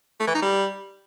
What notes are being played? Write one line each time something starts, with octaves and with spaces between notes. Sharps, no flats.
A3
E3
D#4
G3